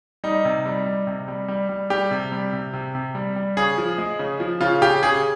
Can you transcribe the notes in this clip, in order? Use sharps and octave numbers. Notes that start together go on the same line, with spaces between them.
G3 D#4
C3
G3
G3
C3
G3
G3
G3
G3 G4
C3
G3
C3
C3
C3
G3
G3
C#3 G#4
F3
G#3
C#3
F3
C#3 F4
C#3 G4
C#3 G#4